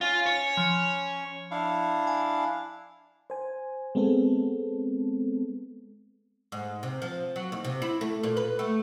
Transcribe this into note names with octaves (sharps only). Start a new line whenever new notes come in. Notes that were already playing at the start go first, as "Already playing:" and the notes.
C#4 F4
C#5
F3
D4 E4 F5
G#5
C5 G#5
G#3 B3 C4 A4
G#2
C3
F3
F#3
D#2
C3
E4
A3
A#2
B4
A3